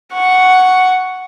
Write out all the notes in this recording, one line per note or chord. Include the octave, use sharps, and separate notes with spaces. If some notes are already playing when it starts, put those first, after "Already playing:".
F#5 C#6